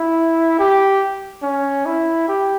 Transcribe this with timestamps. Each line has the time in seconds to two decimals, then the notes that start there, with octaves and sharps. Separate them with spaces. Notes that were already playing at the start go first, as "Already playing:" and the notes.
Already playing: E4
0.59 G4
1.43 C#4
1.86 E4
2.28 G4